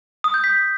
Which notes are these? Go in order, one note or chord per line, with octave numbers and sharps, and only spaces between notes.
D#6
G6
B6